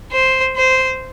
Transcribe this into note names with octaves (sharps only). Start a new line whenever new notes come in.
C5
C5